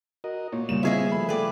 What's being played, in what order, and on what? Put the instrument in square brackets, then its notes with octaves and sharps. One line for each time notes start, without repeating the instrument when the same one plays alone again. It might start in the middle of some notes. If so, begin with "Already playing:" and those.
[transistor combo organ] F#4 A#4 D#5
[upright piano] A#2 [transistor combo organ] C#5
[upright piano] A#2 E7 [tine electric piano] C#3 G3 A#3
[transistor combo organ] B3 C4 [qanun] E4 G#4 E5 [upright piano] F4 C#5 D#5
[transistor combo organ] F3 A3 [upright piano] B5
[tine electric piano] A4 G5 D6 [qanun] B4 D5